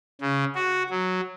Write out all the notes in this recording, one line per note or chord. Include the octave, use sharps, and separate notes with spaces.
C#3
F#4
F#3